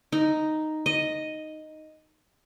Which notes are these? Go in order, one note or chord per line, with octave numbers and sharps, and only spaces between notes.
D#4
D#5